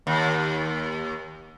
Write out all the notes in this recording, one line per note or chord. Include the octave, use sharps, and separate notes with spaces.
D#2